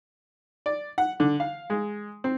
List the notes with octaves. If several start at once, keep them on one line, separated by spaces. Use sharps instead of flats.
D5
F#5
D3
F5
G#3
C4